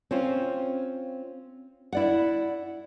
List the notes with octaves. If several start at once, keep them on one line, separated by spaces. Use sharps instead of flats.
C4 C#4 F4
E4 D5 F#5